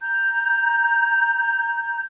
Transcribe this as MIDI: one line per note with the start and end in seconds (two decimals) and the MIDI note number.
0.01 2.02 82
0.01 2.02 91